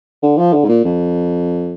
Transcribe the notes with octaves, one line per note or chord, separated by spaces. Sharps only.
D3
F3
D3
G#2
A#2
F2